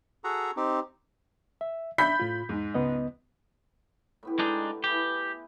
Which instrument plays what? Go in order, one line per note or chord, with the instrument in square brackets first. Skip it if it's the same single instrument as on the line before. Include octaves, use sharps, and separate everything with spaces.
[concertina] F#4 G#4 A4 F#5 A#5
C4 D#4 G4
[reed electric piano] E5
[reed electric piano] D4 E5 [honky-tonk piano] B5 G6 B6
[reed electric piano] A2 F4
[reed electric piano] E2 [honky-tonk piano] G#2
[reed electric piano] C#2 B3 D#5
[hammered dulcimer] A2 B3 G4
[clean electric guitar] G#3 D4 D#4
[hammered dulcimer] E4 G#4 B4 [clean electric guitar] G4